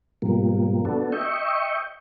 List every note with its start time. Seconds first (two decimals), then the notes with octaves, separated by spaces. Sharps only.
0.22 G#2 B2 F3 G3 A#3
0.85 B3 D4 F#4 A4
1.12 D#5 E5 G5 C#6